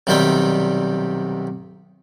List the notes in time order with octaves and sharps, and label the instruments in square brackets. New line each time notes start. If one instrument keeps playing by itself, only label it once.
[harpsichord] B1 C3 D#3 G3 D5 G5